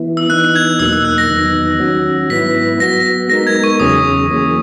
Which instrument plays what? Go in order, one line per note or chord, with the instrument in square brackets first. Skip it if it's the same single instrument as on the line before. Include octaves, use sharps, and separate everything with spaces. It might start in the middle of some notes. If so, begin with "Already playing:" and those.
Already playing: [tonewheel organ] E3 B3 E4
[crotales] E6
[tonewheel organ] E3 B3 D#4 [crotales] F#6
[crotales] G#6
[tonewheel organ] E2 B2 F#3 A#3 D#4 [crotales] E6
[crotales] E6
F#6
A#6
[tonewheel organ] E2 D#3 F#3 B3 D#4
D#3 F#3 C#4 F#4
[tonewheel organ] G#2 F#3 B3 E4 B4 [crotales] B6
[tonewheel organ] F#3 B3 F#4 [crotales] A#6
[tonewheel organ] G#3 B3 D#4 A#4 [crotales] A#6
[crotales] G#6
C#6
[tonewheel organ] E2 C#3 F#3 C#4 G#4 [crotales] D#6
[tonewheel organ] E3 A#3 C#4 G#4